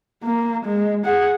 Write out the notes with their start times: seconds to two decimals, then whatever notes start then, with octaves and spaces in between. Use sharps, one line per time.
0.24 A#3
0.65 G#3
1.05 G#4 F#5